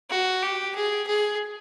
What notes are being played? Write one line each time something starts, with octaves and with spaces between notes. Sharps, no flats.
F#4
G4
G#4
G#4